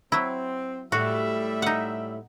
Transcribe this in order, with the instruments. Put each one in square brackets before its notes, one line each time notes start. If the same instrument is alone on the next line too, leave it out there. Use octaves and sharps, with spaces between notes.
[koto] F#3 E4 [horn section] C4
[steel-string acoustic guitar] A2 A3 [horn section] G3 E5 [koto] F#4
[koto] D#4 F#5